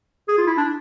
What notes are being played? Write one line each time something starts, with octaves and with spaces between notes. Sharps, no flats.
G#4
F4
E4
D4